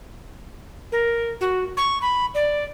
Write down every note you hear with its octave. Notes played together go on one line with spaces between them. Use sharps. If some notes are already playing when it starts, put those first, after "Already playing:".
A#4
F#4
C#6
B5
D5